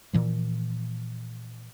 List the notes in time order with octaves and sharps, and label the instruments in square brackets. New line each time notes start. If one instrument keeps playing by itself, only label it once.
[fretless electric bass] A#2 E3 F3